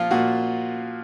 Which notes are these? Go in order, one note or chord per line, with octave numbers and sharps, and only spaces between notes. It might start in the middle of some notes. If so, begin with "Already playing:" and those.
Already playing: A#2 F3 F4
A#2 F#4